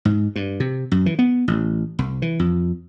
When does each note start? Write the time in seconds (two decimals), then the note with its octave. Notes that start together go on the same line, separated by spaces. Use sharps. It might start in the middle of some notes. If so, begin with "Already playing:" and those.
0.05 G#2
0.36 G2
0.60 C3
0.92 F#2
1.06 E3
1.19 B3
1.48 A1
1.99 C2
2.22 E3
2.39 F2